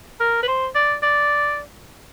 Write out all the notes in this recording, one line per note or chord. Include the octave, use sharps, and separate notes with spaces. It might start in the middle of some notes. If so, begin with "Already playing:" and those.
A#4
B4
C5
D5
D5